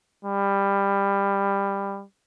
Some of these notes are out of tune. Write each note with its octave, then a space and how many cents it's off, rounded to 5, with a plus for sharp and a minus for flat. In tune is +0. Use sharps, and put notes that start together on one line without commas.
G3 +20